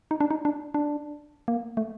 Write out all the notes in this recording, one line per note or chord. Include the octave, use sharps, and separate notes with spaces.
D#4
D4
D#4
D4
D4
A#3
A3